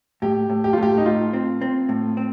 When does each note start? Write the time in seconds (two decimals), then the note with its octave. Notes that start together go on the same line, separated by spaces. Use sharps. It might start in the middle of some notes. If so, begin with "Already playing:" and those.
0.22 A2 G4
0.50 A2
0.64 G4
0.73 F4
0.78 A2 G4
0.98 D#4
1.05 A2 F4
1.33 C4
1.61 C4
1.89 A2
2.17 C4